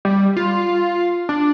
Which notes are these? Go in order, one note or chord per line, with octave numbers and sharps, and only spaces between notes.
G3
F4
D4